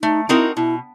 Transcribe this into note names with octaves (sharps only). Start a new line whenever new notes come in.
A3 D#4
C4 D#4 E4 F#4 A#4
B2 E4